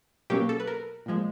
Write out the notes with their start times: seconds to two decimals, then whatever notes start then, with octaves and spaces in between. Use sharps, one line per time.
0.30 B2 F#3 A#3 C#4 G4
0.49 A4
0.60 B4
0.67 A#4
1.06 A#2 F3 G#3